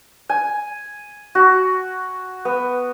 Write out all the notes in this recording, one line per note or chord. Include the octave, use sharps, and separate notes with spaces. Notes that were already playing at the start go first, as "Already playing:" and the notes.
G#5
F#4
B3